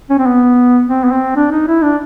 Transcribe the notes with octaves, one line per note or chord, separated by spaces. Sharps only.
C#4
C4
B3
C4
B3
C4
D4
D#4
E4
D4